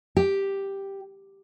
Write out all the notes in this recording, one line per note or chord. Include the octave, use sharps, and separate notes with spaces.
G4